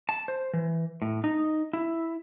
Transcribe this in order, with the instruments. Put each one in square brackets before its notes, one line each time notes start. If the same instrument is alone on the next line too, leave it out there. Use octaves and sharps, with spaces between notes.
[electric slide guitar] A5
C5
E3
A2
D#4
E4